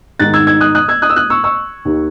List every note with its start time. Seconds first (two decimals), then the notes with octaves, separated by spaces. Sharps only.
0.19 G#2 D#3 F#6 A6
0.34 E6 G#6
0.47 E6 G#6
0.60 D#6 F#6
0.75 D#6 F#6
0.88 E6 G#6
1.02 D#6 F#6
1.10 E6
1.16 D#6 F#6
1.30 C#6 E6
1.44 C#6 E6
1.85 D#2 D#3